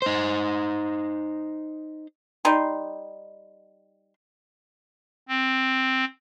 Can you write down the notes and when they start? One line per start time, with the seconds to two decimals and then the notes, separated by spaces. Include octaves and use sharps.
0.02 D#4 C5
2.45 G3 D#4 C6
5.29 C4